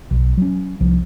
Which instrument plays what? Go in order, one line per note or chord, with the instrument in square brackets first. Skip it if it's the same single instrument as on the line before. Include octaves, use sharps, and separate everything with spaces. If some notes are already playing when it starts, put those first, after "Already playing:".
[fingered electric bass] B1
F#3 C#4
C2 F3